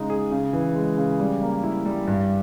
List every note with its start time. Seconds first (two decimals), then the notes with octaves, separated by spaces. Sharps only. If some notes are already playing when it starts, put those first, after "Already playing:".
Already playing: C#3 G#3 D#4
0.10 G#4
0.31 C#3
0.53 E3
0.75 G#3
0.97 C#3
1.20 G3
1.42 A#3
1.63 E4
1.85 G3
2.07 G2